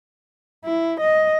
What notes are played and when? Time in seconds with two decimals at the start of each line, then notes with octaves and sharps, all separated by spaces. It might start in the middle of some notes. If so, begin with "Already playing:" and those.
0.65 E4
1.00 D#5